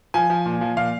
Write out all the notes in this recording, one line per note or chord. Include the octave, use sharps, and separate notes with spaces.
F3 G#5
F3
A#2
F3
A#2 F5